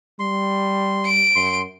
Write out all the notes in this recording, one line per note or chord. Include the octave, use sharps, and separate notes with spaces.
G3 C6
D7
F#2 C6